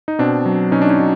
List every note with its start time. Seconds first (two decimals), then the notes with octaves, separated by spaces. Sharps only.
0.08 D#4
0.19 B2 C4 D4
0.46 F#3
0.72 B2 C#4 D#4
0.82 D4
0.90 C#4 D#4
0.99 F#3